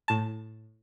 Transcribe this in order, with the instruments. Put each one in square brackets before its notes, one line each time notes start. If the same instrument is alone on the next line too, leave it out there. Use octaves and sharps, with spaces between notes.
[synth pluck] A2 A5